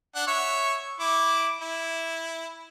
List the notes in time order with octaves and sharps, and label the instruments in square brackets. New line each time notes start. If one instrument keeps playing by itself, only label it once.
[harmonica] D4 F#5
C#5 E5 C#6
E4 D6
E4